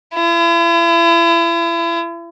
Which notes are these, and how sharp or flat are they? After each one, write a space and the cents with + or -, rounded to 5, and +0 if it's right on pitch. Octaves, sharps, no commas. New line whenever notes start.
E4 +40